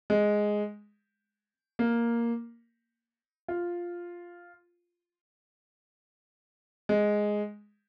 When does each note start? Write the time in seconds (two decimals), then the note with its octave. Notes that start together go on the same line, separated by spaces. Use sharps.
0.10 G#3
1.79 A#3
3.48 F4
6.89 G#3